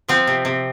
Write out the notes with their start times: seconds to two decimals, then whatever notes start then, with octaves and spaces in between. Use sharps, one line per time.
0.08 F3 C4
0.27 C3
0.45 C3